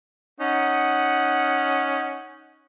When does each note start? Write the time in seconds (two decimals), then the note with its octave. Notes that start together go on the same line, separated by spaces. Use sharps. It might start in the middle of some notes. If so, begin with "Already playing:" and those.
0.40 C#4 D#4 F#5